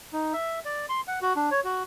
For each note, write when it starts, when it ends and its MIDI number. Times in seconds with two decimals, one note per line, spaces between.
0.13 0.33 63
0.33 0.60 76
0.65 0.86 74
0.89 1.01 84
1.08 1.19 78
1.22 1.33 66
1.36 1.50 62
1.51 1.60 73
1.64 1.83 66